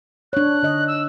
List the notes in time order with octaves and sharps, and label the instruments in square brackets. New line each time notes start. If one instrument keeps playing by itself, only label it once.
[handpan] D4 C#5 [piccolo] F#6
[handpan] D3 D#5
[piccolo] E6